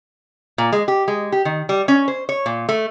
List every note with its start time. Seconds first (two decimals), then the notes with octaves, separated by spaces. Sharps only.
0.58 A#2
0.73 G#3
0.88 G4
1.08 G#3
1.32 G4
1.45 D#3
1.69 G3
1.88 C#4
2.08 C5
2.29 C#5
2.46 A#2
2.69 A3